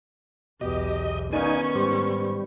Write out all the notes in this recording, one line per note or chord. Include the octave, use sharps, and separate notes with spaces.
B1 E2 B2 G4 D#5
D#3 B3 C#4 D#4 D5 F5 G#5 C#6
G#2 G3 G4 C5